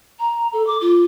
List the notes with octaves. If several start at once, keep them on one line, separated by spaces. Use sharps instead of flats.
A#5
A4
D6
F4